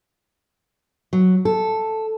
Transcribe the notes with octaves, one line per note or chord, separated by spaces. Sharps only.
F#3
A4